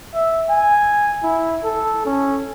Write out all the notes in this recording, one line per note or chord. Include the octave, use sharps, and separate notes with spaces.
E5
G#5
E4
A4
C#4